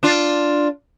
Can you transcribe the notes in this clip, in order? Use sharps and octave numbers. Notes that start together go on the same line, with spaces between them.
D4 F4